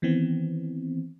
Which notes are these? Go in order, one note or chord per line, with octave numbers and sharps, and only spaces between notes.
D#3 E3 B3 C4